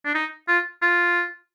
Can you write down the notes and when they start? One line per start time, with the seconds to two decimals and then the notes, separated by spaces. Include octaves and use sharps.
0.05 D4
0.15 D#4
0.48 F4
0.82 F4